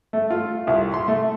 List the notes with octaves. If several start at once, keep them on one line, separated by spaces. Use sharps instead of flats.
A3
F4
C2
C6
A3